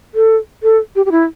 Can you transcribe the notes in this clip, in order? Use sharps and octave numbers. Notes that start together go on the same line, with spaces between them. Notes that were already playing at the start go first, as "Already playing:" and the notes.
A4
A4
G4
G4
E4